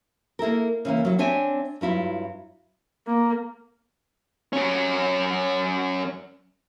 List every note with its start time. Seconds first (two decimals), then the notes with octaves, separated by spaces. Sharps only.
0.39 A#3 E4 A4 A#4
0.85 C#3 E3 A#3
1.05 F#3 E4
1.19 C4 D4 C#5 E5 G#5
1.81 G2 F#3 E4 F4
3.07 A#3
4.53 F#2 C#4